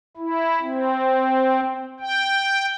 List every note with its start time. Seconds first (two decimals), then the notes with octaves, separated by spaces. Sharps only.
0.17 E4
0.62 C4
2.00 G5